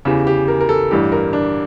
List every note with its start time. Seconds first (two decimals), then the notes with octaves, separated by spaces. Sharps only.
0.05 E2 C#3 E3 G4
0.27 G4
0.48 A#4
0.60 A#4
0.69 A4
0.91 A1 G2 E3 G4
1.12 A#4
1.33 D4